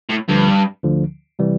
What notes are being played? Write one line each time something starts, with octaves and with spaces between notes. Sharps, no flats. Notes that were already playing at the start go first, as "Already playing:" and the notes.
A2
D2 G2 D3 F3
D2 D3 F3
C3 E3 G3